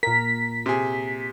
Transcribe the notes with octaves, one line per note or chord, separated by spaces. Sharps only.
A#2 A#4 B6
C3 G#4